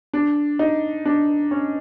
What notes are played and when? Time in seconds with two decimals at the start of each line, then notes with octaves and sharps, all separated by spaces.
0.14 D4
0.59 D#4
1.06 D4
1.51 C#4